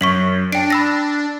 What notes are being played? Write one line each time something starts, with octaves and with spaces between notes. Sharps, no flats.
F#2 C#6 B6 F#7
D4 G5 D7
B5 E6 A#6